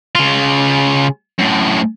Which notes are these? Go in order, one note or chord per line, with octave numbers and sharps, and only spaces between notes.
C#3 F4
F#2 A2